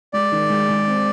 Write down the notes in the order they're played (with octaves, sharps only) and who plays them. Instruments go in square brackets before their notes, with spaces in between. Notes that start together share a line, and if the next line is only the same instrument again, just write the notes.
[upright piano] G#3 [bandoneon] D5
[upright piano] D#3
G#3
G#3
C4